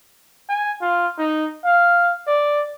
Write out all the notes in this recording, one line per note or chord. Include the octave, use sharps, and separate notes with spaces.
G#5
F4
D#4
F5
D5